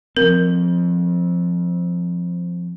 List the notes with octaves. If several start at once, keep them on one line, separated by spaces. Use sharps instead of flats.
F3 C4 A#4